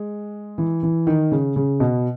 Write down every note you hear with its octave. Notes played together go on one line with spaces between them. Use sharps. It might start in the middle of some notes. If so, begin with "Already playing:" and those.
Already playing: G#3
E3
E3
D#3
C#3
C#3
B2